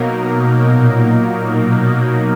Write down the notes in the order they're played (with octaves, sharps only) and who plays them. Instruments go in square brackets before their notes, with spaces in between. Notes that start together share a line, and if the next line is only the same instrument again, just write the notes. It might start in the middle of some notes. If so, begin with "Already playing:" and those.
Already playing: [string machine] B2 [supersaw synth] F#3 A#3 D#4 A#4
[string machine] A#2
B2